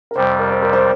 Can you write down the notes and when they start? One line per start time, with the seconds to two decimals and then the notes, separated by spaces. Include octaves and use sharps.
0.11 A#4
0.16 F2 C3 G3 C5
0.39 A#4
0.50 C5
0.62 A#4
0.73 C5